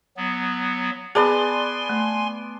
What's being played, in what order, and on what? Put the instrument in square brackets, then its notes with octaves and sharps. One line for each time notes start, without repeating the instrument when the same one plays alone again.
[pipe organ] F#3 B3
[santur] B3 D5 A5 [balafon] G#4 [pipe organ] G#5 C6
[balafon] A3